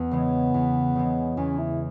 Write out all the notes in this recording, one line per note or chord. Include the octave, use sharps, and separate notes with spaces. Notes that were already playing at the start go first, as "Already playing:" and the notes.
Already playing: E2 B3
C#3 E3 G#3
E2
C#3 E3 G#3
E2 C#4
E4